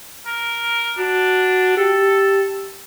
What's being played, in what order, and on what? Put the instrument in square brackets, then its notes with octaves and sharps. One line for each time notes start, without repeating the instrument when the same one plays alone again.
[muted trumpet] A#4
[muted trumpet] D4 [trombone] F#4
[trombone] G4 [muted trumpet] A4